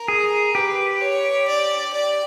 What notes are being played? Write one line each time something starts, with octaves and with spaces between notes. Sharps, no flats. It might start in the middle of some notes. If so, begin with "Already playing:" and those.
Already playing: A#4
G#4
G4 B4
C#5
D5
D5